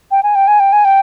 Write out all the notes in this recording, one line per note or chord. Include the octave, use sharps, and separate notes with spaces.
G5
G#5
G5
G#5
G5
G#5
G5